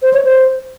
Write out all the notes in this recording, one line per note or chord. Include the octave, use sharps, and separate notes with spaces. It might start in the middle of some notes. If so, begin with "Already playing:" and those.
C5
C#5
C5